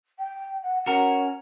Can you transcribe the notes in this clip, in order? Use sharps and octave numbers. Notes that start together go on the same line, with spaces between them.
G5
F#5
C#4 F#4 A#4